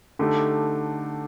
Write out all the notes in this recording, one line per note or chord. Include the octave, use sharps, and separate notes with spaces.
D3 A3 D#4 G4